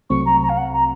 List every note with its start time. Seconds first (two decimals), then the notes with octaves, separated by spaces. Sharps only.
0.10 C2 C3 F#3 A3 C4 C#6
0.25 A#5
0.42 A#5
0.49 F5
0.57 F#5
0.73 A#5